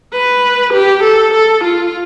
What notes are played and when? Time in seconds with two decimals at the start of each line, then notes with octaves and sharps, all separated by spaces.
0.13 B4
0.73 G4
1.03 A4
1.34 A4
1.64 F4